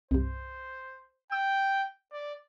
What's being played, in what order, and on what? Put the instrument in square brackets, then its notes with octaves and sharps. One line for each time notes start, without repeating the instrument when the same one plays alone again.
[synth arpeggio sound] C2 G2 [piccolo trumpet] C5
[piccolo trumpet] G5 [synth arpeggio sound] E6
[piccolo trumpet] D5